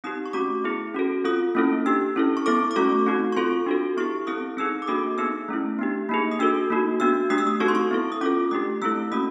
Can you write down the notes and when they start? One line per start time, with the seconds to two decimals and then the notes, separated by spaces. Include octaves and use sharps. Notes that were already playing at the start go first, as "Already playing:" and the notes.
0.04 C4 D#4 G4 D#6
0.26 C#6
0.33 A3 C#4 F#4 D6
0.64 B3 E4 G#4
0.94 C#4 F#4 A4
1.24 C4 F4 A4 D#6
1.55 A#3 C#4 E4 A4
1.86 D4 G4 E6
2.16 C#4 E4 A4
2.37 C#6
2.46 B3 E4 A4 D6
2.71 D6
2.76 A3 C#4 F#4 A4 C#6
3.06 C4 D#4 F#4
3.32 C#6
3.36 C4 F4 A4 C6
3.66 D4 F#4 A4
3.97 B3 E4 G4 C#6
4.27 C4 E4 A4 D#6
4.57 C4 D#4 G#4 E6
4.82 D6
4.87 A#3 D4 F#4 A4 D#6
5.18 B3 D#4 G#4 E6
5.48 A3 C#4 E4
5.79 B3 D4 G4
6.09 A#3 D#4 G#4
6.31 D#6
6.39 D4 F#4 A4 E6
6.70 A#3 D#4 F#4
7.00 B3 D4 F#4 E6
7.30 A3 D4 G4 D#6
7.38 E6
7.47 D#6
7.60 C4 D#4 F#4 A4 C#6
7.68 C6
7.75 C#6
7.91 B3 E4 A4
8.12 D#6
8.21 C#4 F4 A4 D6
8.51 A3 D4 G4 D#6
8.82 A3 C4 E4 A4 E6
9.12 A#3 C#4 F#4 D#6